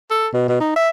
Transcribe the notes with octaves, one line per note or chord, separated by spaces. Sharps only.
A4
B2
B2
D#4
E5